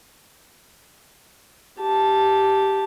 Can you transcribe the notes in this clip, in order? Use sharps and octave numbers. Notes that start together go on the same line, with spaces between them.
G4 A5